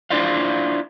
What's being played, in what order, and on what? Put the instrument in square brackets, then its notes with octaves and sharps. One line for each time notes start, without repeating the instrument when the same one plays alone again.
[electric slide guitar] D4 E4 F4 C5 D5 F5